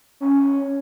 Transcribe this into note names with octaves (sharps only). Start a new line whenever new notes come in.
C#4